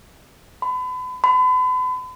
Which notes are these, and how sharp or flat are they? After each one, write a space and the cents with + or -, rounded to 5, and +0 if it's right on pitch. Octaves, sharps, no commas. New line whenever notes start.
B5 +35
B5 +40